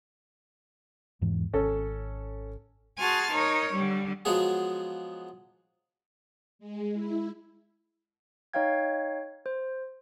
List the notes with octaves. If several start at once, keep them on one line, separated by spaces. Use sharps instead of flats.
E2 G#2 E3
G#1 C#4 A4
F#4 G#4 G#5 A5 C6 F6
D#4 A#4 C#5
D3 G3
F3 F#3 G#3 B3 G#4
G#3
E4
D#4 C#5 D#5 F5 G5 G#6
C5